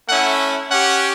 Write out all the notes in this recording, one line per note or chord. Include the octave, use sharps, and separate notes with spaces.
A3 C#4 E4 F#5
C#4 G4 F#5